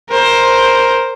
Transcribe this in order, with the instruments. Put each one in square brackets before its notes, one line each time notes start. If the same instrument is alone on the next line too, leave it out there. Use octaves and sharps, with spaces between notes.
[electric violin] A#4 C5